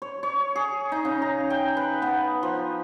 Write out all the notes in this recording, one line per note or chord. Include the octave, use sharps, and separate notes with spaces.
C#5
C#5
G#4
D#4
C#3
A#5
G5
B4
B3
F3